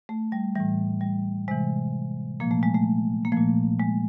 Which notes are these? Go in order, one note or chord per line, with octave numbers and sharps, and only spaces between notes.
A3
G3
A2 E3 G3
G3
C3 E3 G#3
A#2 F3 A#3
A3
G#3
A3
A#3
F3 A3
A#2
G#3